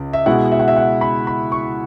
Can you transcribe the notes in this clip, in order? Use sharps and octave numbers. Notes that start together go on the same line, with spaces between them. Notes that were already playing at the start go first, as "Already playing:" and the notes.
Already playing: C#2
E5
B2 G#3 E4 F#5
E5
F#5
E5
F#5
B5
B5
C#6